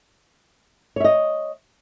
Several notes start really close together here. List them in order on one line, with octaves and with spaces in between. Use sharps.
C#5 E5 D#5